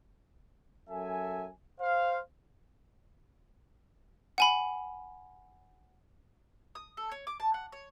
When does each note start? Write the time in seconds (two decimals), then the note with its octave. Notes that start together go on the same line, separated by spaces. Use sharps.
0.88 F#2 A4 E5 G#5
1.80 C5 F5
4.38 F#5 G#5 B5
6.75 D#6
6.97 A4
7.12 C#5
7.27 D6
7.40 A5
7.54 F#5
7.72 C#5